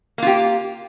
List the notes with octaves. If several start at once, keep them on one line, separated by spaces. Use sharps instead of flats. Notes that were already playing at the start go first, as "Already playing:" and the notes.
A#3 F4 G4